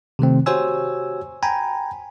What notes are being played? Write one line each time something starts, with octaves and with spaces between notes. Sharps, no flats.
C3 D#3 A3 C4
F#4 G4 C5 C#5 G#5 E6
G5 G#5 A#5 B5